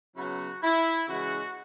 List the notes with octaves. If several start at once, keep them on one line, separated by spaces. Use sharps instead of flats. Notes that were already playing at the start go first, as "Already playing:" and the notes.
C#3 F#3 B3 E4 F#4
E4
C#3 E3 G#3 E4 F#4